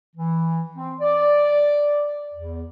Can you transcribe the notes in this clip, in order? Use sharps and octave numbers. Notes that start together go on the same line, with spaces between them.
E3
C4
D5
E2